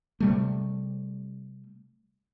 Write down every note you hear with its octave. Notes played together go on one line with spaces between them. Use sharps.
C3 G3 A3